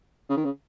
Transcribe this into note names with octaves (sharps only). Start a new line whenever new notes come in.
C#3
D#3
C#3